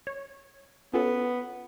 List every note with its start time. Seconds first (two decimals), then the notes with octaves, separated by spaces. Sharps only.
0.07 C#5
0.94 B3 C#4 F4 A4